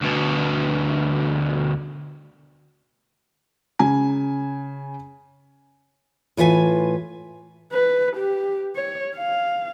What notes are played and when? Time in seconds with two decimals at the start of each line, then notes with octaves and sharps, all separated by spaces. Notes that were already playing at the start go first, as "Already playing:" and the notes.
0.03 D2 B2
3.79 C#3 G#5
6.37 A2 E3 F4 B4 G#5
7.73 B4
8.17 G4
8.76 C#5
9.16 F5